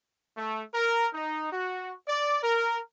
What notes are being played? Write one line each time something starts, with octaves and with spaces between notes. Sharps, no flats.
A3
A#4
D#4
F#4
D5
A#4